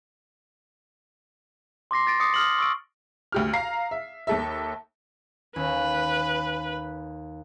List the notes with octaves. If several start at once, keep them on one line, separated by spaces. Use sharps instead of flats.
C6 D6 A#6 C7
A6 A#6 D7
D6 D#6 C7 C#7
D#6 F6 F#7
C#6 E6 D7
D2 G4 F6
F5 A#5 C7
E5
D#2 A4 E5
D#2 C#4 B4